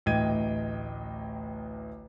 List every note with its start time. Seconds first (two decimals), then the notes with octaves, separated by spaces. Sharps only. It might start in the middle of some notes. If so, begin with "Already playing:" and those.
0.06 A1 D2 D#5 G5 G#6 D#7